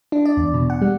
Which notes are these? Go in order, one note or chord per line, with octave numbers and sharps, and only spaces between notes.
D4
D5
E2
B2
F#5
G3